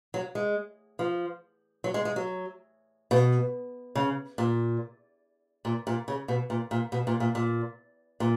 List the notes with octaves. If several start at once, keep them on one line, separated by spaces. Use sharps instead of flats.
F#3
G#3
F3
F#3
G#3
G#3
F#3
B2
C#3
A#2
A#2
A#2
C#3
B2
A#2
A#2
B2
A#2
A#2
A#2
A#2